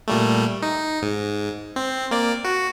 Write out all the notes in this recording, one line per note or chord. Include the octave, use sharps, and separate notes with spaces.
A#2 G3 A3
D#4
G#2
C4
A#3 D5
F#4